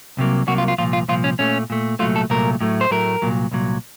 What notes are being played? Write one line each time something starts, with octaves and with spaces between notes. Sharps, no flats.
C2 C3 F#3 A#3
C2 C3 F#3 A#3 F#4
F4
F4
C2 A#2 F3 F4
F4
C2 A#2 F3 F4
C#4
A#2 A3 C#4
A#2 A3
C2 A#2 F#3 A3 F4
A4
C2 A#2 F#3 A3 A#4
A2 F#3 A3
C5
A2 F#3 A3 A#4
C2 A#2 F#3
C2 A#2 F#3